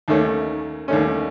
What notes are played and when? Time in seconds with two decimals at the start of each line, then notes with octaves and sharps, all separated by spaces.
0.08 D#2 D#3 A3 C#4
0.88 D#2 D#3 A3 C#4